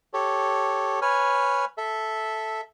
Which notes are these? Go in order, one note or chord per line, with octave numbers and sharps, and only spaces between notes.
G4 A4 C#5
B4 C#5 G#5 F6
A4 E5